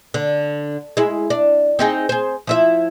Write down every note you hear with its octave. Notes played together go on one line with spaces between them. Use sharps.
D3
G#3 E4
D4
C4 D#4 G#4
G#4 C5
F3 E4 E5